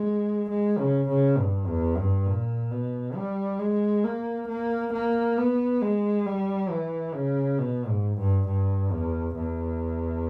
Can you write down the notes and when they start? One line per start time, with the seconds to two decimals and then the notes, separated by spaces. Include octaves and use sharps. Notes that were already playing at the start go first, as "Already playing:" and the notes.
Already playing: G#3
0.50 G#3
0.79 C#3
1.09 C#3
1.39 G2
1.68 E2
1.97 G2
2.27 A#2
2.72 B2
3.15 G3
3.60 G#3
4.04 A#3
4.48 A#3
4.93 A#3
5.38 B3
5.82 G#3
6.26 G3
6.70 E3
7.14 C#3
7.59 B2
7.89 G#2
8.18 G2
8.48 G2
8.92 E2
9.36 E2